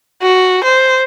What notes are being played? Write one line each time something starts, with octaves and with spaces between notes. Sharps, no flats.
F#4
C5